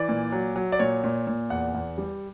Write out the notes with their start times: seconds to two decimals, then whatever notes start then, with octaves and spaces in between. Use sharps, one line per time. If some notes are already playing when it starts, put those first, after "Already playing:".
Already playing: E3 D5
0.09 A#2
0.32 F#3
0.56 F#3
0.72 D5
0.79 A#2 C#5
1.04 A#2
1.27 A#2
1.50 E2 F#5
1.74 E2
1.98 G3